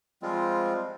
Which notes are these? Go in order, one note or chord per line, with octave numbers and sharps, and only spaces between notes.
F3 G3 G#3 C4 F4